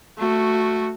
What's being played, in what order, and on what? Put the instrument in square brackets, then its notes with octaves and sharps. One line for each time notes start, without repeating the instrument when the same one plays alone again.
[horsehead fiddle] A3 F#4